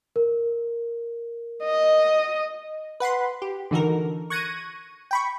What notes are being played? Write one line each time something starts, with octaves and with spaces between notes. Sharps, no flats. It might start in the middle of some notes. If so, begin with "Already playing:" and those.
A#4
D#5
B4 F#5 B5 C6
G4
D3 E3 D#4 F#4 A4 A#4
C#6 F#6 G#6 A#6 C#7 D#7
G5 B5 C#6